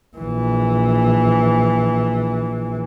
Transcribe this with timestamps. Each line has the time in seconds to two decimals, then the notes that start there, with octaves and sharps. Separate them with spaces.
0.17 A#1 E3